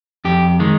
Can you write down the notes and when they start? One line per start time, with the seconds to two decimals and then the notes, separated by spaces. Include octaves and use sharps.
0.25 F2 G4
0.60 D#3 G#3